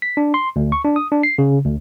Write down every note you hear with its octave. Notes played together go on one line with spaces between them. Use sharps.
B6
D4
C6
D2
C#6
D4
D#6
D4
C7
C#3
D2